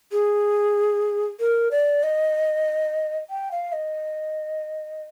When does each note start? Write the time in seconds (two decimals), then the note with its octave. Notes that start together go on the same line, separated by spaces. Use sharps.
0.12 G#4
1.40 A#4
1.71 D5
2.03 D#5
3.30 G5
3.52 F5
3.73 D#5